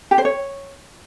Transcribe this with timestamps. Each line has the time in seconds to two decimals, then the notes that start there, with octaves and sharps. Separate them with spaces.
0.11 G4
0.18 C5
0.25 C#5